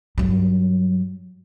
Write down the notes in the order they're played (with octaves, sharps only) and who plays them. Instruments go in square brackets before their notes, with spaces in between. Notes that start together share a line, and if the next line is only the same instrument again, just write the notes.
[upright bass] G2 F#3